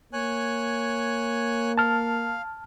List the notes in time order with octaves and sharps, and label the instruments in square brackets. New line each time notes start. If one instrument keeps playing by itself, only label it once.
[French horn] A#3 [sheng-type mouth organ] C#5 G#5 F#6
[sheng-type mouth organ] F5 [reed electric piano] A5 F6